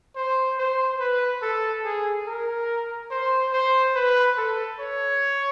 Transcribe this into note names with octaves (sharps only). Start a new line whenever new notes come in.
C5
C5
B4
A4
G#4
A#4
C5
C5
B4
A4
C#5